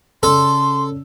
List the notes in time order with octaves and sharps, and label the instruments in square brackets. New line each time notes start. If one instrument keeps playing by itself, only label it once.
[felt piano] C#3 D5 E6 [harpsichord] A4 [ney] C6